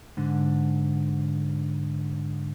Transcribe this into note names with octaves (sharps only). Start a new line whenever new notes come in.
G#2 D3